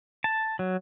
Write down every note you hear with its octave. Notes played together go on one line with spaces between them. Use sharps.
A5
F#3